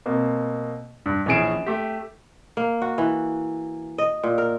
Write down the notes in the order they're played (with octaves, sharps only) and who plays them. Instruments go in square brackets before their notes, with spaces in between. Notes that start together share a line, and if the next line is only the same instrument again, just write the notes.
[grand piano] B2 A#3 C4
G2
A#1 E3 C#4 G#4 D7 E7
A3 G4
[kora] A#3
F#4
E3
D#5
A#2
A#4